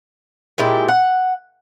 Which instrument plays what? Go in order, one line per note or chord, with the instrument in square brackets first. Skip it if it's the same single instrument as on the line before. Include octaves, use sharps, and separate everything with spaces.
[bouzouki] A#2 G#3 E4 G4
F#5